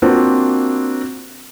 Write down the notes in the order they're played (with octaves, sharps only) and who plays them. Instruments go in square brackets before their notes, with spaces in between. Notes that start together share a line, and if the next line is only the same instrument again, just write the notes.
[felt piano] A#3 C4 D4 F4 F#4 C5